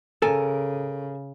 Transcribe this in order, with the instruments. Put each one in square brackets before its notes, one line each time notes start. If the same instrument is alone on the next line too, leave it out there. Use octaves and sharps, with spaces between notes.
[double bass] C#3 [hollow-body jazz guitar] A4 A#4 G#5